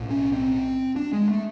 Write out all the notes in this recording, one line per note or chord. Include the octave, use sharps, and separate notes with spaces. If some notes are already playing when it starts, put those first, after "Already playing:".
Already playing: B1 A2
C#4
C4
D4
G#3
A3